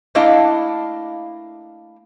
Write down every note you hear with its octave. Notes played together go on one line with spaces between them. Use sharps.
A3 A#3 D4 E4 D#5 F5